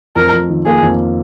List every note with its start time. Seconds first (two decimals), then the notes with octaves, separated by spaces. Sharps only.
0.16 F2 A#4
0.32 F2
0.49 D#3
0.66 A#3 G#4
0.83 F2